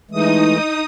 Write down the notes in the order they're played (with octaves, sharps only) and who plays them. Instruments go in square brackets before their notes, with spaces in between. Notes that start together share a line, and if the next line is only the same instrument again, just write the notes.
[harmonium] E3 G#3 A3 [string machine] D#4 D#6